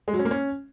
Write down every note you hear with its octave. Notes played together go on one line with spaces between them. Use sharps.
G#3
F#3
C#4
A#3
C#4